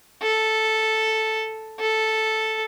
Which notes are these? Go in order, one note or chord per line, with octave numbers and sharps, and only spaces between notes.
A4
A4